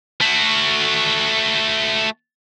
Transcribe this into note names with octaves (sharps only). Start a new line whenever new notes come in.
A3 F#4